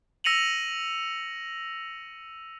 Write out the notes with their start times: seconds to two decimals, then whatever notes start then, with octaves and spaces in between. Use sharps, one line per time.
0.24 E6 A#6 C#7 D#7 F7 F#7